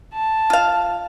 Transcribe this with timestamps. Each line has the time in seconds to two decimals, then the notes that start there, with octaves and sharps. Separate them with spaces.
0.13 A5
0.50 F4 F5